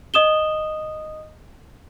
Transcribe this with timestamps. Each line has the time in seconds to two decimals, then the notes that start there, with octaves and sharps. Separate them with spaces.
0.14 D#5 D#6 E7 G7